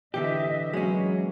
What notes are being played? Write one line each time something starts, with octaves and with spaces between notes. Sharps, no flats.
D3 E3 G4 D#5 E5
E3 F#3 G#3 A#3 C#4